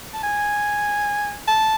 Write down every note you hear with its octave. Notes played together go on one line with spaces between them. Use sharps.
A5
G#5
A5